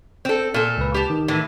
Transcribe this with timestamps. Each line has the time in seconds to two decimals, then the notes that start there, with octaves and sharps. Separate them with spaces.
0.25 C4 A4
0.54 A#2 A4
0.78 C#2 B4
0.94 G4 A5
1.10 D#3
1.28 A2 E3